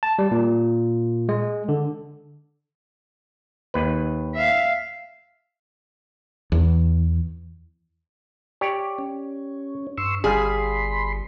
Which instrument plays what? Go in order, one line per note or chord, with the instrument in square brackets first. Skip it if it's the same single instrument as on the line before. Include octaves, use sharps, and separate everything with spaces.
[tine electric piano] A5
G3
A#2
G#3
D3
[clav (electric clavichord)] D#2 B4
[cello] E5 F5
[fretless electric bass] E2
[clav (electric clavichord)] G4 C#5 D5
[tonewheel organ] C#4
[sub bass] G2 [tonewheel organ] C6 C#6 E6
[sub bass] G1 [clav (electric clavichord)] G3 F5 [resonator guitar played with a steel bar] G#4 [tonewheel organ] B5 C6